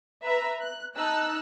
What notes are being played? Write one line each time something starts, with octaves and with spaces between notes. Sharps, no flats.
B4 E5 A#5
F#6
D#4 A5 E6 F#6